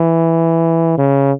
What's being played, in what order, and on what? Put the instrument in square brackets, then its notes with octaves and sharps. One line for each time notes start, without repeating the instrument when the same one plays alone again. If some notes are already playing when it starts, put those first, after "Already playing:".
Already playing: [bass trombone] E3
C#3